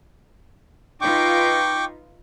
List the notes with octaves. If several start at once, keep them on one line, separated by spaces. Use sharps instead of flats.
D#4 F4 B4 G5 C#6 D6